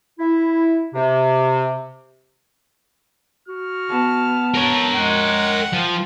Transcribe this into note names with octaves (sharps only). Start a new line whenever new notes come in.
E4
C3
F#4 F6
B3 A5
A#4 C#5
G#3 F#5 G5
F3